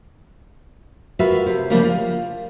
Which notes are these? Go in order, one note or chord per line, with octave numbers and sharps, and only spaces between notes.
F4 F#4 A#4 B4 E5
C3
C#3 F3 G3 A#3
F4